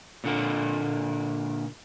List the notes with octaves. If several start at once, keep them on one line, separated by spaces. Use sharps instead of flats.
A#2 D3 A#3